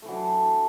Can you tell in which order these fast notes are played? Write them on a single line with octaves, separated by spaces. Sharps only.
A3 E3 F#3 D4